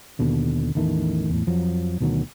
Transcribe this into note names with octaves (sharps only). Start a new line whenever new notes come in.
D#2 B2 D3
A1 E2 D#3 A3
E2 A2
F2 F3 F#3
D2 B2 D#3 F#3